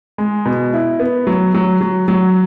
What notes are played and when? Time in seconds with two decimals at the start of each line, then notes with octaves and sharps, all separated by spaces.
0.18 G#3
0.45 B2
0.73 E4
1.00 B3
1.27 F#3
1.54 F#3
1.81 F#3
2.08 F#3